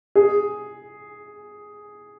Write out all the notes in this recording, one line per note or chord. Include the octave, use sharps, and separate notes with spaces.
G#4